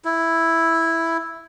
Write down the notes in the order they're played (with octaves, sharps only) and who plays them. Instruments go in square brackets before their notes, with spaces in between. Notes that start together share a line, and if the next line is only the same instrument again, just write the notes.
[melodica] E4